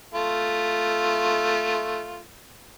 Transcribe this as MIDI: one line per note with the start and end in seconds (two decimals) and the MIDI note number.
0.14 2.23 57
0.14 2.23 65